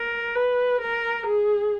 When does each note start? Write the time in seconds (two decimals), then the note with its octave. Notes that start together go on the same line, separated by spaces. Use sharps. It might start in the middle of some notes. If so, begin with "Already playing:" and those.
Already playing: A#4
0.36 B4
0.82 A#4
1.27 G#4